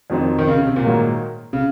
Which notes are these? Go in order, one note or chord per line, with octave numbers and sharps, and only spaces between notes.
F2 D#3 F#3 C4 D#4
D#3
C#3
C#3
C3
A#2
G#2 D#3 F#3 A#3
C#3